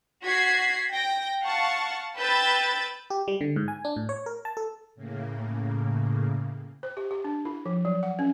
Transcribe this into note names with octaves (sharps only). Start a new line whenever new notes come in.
F#4 G#6 B6 C7
G5 A#6
F5 F#5 A5 C#6
B4 G5 B5 E6 G6 A6
G4
G3
D3
G#2
G#5
D4
A2
C#5
A#4
A5
A4
A2 C#3 A#3
C5
G4
G4
D4
E4
F3
F#3
F#5
C#4